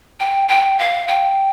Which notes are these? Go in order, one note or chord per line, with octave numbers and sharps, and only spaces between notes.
G5
G5
F5
G5